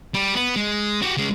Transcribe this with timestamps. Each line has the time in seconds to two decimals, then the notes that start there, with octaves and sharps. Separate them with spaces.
0.14 G3
0.34 B3
0.56 G#3
1.02 F#4 G4
1.17 C#3 G#3